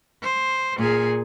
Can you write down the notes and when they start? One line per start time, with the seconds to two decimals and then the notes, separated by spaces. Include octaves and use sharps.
0.22 C5
0.78 A#2 G#4